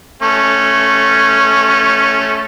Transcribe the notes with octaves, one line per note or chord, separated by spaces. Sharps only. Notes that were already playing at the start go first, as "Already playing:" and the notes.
A3 C#4